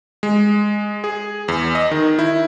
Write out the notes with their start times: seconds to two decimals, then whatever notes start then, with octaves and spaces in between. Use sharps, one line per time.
0.23 G#3
1.04 G#4
1.48 E2
1.75 D#5
1.91 D#3
2.19 E4